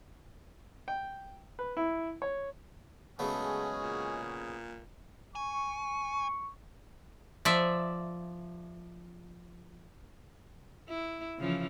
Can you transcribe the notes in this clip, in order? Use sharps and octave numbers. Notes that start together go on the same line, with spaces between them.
G5
B4
E4
C#5
C#3 F#3 G#3 A3 B3 C#4 F#4 G#4
A#2
G#5 C#6
F3 D5 E5
E4
C#3 E3 F3